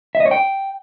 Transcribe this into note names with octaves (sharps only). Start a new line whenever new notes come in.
E5
D#5
C#5
G5